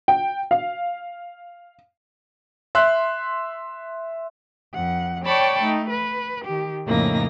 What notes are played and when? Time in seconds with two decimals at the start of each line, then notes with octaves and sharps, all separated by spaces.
0.08 G5
0.51 F5
2.75 E5 C6 F#6
4.74 F2 F#5
5.25 C#5 D5 G5 A5 B5 C#6
5.62 A3 D#4
5.90 B4
6.46 D#3 G4
6.86 F2 A2 C#3 A#3 D#4 A#6